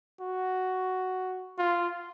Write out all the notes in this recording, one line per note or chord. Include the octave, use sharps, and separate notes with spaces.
F#4
F4